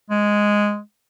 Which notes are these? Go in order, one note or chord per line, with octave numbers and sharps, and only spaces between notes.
G#3